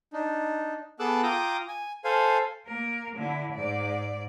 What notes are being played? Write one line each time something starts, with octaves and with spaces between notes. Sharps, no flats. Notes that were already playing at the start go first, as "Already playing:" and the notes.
D4 D#4
B3 G#4 A4 D6 E6 F#6
F4 G5 A#5 D6 D#6
G#5
A4 C5 F5 G#5
A#3 A#4
D3 E4
G#2 D5